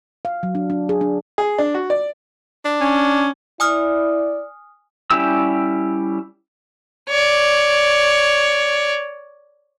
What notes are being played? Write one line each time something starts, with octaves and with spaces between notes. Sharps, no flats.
F5
F#3
D4
D4
G#4
D4
G#4
D4
F#4
D5
D4
C#4
E4 D5 G#5 D#6 F6
G3 C#4 E4 G4 E6
C#5 D5